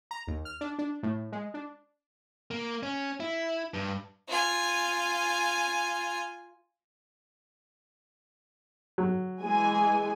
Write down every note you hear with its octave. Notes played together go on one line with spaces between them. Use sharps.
A#5
D#2
F6
D4
D4
A2
G#3
D4
A#3
C#4
E4
G2
F4 G#5
F#3
E3 G#3 G#5